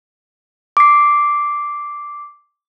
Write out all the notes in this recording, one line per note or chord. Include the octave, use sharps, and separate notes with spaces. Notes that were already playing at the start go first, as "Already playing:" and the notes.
D6 C7